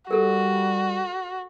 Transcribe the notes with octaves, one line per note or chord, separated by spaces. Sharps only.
G3 F#4 G4 A4 A#4